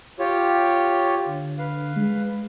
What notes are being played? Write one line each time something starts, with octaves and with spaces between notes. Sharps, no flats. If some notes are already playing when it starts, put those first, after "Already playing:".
F4 G4 C#5
D3
B4 F5
G#3